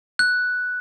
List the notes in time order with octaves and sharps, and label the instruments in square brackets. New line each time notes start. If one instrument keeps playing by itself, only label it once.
[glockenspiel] F#6